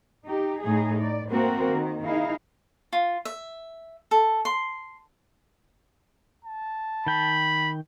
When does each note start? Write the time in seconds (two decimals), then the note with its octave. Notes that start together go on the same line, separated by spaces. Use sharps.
0.25 D#4 G4
0.61 A2 A3 D#4 G#4
0.99 D5
1.30 A3 A#3 C4 F#4 A#4
1.69 D#3
2.04 D#4 E4 G#4 F5
2.93 F4
3.25 E5
4.11 A4
4.45 C6
6.44 A5
7.07 D#3 G5 B5